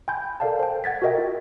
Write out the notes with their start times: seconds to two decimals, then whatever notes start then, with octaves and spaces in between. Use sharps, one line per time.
0.08 G5 G#5 B5 C6 G6
0.40 A4 A#4 D5 F5 G5 A5
0.59 C5 G5
0.84 F#5 G#6 A6 B6
1.02 F#4 G#4 A#4 D#5 E5 G5
1.18 F4